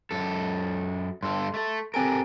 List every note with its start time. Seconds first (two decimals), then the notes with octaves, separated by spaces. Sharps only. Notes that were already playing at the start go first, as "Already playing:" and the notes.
0.11 F#2 A4
1.23 G2 A4 C6
1.54 A3 A4
1.94 C4 G4 A4 A#4 G#5 D7